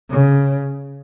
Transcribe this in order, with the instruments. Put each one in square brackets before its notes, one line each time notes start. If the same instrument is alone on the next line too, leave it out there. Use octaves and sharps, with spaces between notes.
[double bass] C#3